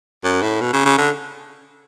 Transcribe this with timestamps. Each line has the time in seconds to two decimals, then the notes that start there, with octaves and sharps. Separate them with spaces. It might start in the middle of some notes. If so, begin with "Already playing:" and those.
0.24 F#2
0.42 A2
0.61 B2
0.73 C#3
0.85 C#3
0.98 D3